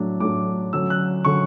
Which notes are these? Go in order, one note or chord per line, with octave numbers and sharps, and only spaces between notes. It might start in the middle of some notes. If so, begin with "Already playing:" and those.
Already playing: A2 F#3 A3 D4
A2 F#3 A3 D4 D6
D3 F#3 C#4 E6
F#6
D3 F#3 C#4 C#6